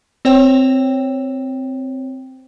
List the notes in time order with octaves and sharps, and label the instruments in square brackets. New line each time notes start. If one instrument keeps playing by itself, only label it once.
[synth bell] C4 C5 C#5 G5